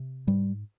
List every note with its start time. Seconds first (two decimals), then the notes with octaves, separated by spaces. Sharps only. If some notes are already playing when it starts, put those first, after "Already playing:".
Already playing: C3
0.27 G#2 G3